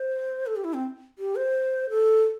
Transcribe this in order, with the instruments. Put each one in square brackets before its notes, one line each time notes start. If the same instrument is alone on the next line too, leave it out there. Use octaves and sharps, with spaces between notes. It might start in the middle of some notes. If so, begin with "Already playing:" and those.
Already playing: [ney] C5
A4
G4
E4
C4
G4
C5
A4